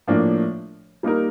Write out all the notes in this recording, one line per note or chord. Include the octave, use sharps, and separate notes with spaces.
A2 F3 A#3 D4
G3 A#3 D#4 A#4